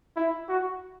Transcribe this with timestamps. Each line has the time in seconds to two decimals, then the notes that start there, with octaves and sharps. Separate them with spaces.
0.16 E4
0.49 F#4